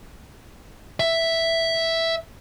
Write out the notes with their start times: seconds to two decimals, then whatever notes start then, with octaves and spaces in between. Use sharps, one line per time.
1.00 E5